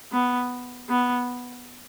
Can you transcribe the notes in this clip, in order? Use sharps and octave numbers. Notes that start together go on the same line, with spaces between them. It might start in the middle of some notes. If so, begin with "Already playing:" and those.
B3
B3